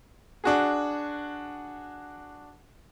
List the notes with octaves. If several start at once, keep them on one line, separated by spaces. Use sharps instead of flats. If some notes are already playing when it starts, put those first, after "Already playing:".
D4 F#4 G#4